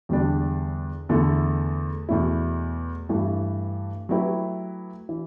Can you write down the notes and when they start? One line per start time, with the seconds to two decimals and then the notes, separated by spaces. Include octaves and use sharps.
0.09 E2 D3 G3 D4
1.09 E2 D3 A3 E4 A4
2.09 E2 B2 A3 E4
3.09 G2 E3 A3
4.09 F#3 A3 E4 G4 B4
5.09 E3